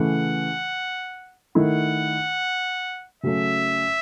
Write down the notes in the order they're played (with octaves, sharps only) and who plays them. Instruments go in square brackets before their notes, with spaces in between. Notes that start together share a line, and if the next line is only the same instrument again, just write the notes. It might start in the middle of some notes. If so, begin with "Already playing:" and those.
Already playing: [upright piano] C#3 E3 A3 [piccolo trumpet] F#5
[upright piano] D#3 A3 E4 [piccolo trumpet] F#5
[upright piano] C#3 F#3 A3 C#4 [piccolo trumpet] E5